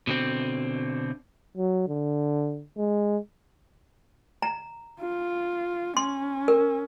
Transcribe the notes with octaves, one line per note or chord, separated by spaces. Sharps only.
B2 D3 C4
F#3
D3
G#3
A#5
F4
C#4 C6
A#4